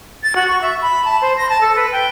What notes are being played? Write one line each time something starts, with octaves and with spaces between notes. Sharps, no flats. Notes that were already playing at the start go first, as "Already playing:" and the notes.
A6
F#4
C#6
E5
B5
A5
C5
A#6
A5
A4
B4
G5